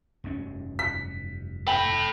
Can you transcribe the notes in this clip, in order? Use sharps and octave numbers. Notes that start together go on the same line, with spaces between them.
F1 G2 C#4
B6
A4 G5 B5